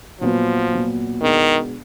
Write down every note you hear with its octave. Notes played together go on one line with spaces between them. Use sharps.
A#2 F3 F#3 B3
A#2 F#3 B3
B2 D#3 G#3 B3 D4